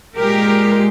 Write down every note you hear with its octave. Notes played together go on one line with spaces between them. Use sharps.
A#2 G#3 G4 A#4